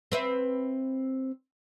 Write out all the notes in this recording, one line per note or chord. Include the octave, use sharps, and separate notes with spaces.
C4 B4 E5